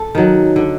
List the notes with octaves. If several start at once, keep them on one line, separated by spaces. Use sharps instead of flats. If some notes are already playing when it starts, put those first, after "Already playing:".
Already playing: A4
D#3 F#3
D3